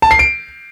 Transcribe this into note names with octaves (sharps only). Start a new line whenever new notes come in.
A5
C7
D7